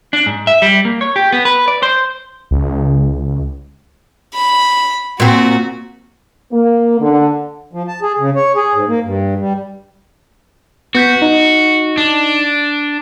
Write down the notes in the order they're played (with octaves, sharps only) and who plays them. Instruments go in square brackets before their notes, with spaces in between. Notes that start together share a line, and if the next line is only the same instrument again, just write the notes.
[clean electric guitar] D4
G#2
E5
G3
A#3
C#5
G4
B3
B4
D5
C5
[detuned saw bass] C#2
[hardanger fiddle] B5
[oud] A#2 C4 [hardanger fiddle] F#4
[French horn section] A#3
D3
[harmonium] F3
A5
G#4
C#3
C#5
G#4
G#2
A#3
G2
G3
[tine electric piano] B3 G6 B6 [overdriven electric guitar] F#4
[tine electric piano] D#4
[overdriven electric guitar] D4